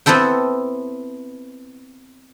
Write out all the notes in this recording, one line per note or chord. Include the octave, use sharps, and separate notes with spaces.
B3 C4 E4 A4 G5